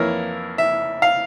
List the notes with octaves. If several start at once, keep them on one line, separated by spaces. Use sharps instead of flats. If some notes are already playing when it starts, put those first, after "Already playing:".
Already playing: F2 E3 A#3 E4 A#4 C#5
E5
F5